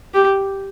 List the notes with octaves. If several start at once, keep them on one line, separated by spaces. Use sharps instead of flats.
G4